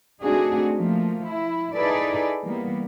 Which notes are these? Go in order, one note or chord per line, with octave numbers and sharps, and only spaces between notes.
A3 C4 D4 D#4 F#4 G#4
F3 A3 A#3
E4
D#4 E4 G#4 A4 B4 D5
E3 G3 A#3 B3